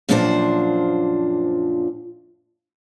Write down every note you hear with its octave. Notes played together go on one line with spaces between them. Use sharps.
F#2 A#2 F3 D4 F#4 C5